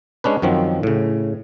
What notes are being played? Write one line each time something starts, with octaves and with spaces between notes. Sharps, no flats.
G#3 C#4 D4 B4
F#2 D#3 F3 F#3 C4
A2 C#3